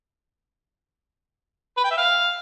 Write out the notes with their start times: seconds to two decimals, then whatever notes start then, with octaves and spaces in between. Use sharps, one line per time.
1.77 B4
1.84 G5
1.91 E5
1.98 F5